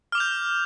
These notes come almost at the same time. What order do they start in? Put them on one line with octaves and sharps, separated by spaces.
F6 D6 F7 G6